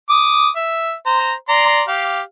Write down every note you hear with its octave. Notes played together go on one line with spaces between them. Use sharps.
D6 D#6
E5
C5 A#5
D5 A#5 C6
G4 F5